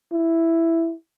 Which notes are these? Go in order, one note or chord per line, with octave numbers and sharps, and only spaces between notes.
E4